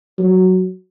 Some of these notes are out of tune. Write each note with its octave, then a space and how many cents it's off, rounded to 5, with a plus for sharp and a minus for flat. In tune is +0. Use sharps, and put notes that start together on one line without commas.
F#3 +5